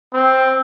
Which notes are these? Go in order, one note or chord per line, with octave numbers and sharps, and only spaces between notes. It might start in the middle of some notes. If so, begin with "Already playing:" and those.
C4